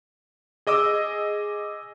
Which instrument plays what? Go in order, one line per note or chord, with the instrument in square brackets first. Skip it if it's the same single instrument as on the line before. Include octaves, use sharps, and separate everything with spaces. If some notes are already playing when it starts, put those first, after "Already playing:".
[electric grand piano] G#4 D#5 D6 E6